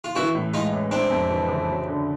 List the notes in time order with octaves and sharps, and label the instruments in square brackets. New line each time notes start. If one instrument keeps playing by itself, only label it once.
[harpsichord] F4
[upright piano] E3 [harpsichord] E4 F#4
[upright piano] A2
[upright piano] G#3 [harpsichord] D#4 F4
[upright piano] A1
[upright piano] C3 [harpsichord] C4 D4
[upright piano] F2
E3
F#1
F#3
D3